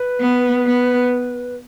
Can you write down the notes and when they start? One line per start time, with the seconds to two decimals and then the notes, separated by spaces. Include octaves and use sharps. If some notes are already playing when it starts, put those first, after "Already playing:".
Already playing: B4
0.20 B3
0.66 B3